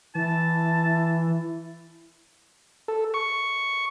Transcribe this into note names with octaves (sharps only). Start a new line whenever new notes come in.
E3 E4 A5
A4
C#6